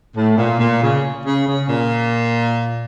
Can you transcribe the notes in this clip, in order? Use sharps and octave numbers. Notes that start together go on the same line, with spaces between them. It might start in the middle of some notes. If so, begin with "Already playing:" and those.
A2
A#2
A#2
C#3
C#3
C#3
A#2